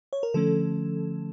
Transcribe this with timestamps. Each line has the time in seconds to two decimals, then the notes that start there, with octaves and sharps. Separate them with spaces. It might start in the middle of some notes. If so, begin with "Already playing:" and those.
0.13 C#5
0.23 A#4
0.34 D3 F3 A3 C#4 A4